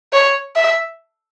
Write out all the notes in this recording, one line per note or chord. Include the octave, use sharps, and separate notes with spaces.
C#5
E5